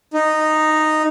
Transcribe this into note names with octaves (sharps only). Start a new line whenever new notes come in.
D#4